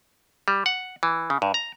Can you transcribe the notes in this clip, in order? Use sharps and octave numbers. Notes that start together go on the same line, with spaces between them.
G3
F#5
E3
C#3
G2
A#5